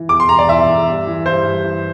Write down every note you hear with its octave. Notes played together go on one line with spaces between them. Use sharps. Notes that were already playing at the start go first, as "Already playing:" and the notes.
Already playing: E3
E2 D6
C6
E2 A#5
D5
E2 E5
E2
G2
E3
G2 C5
G2
E3